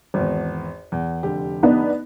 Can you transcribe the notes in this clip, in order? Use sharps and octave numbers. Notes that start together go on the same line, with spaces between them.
G#1 E2
E2
F1 D3 G4
B3 D4 D#4